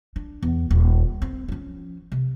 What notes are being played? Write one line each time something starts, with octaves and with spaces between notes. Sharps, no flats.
D4
E2
D#1
C4
F3 C#4
C3